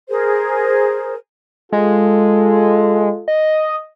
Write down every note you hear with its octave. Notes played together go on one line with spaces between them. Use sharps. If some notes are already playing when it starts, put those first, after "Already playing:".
G#4 A#4 C5
G#3 F4 A4
D#5